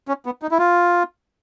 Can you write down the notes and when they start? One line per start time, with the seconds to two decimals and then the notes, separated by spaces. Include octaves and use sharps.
0.08 C#4
0.26 B3
0.42 D#4
0.51 E4
0.59 F4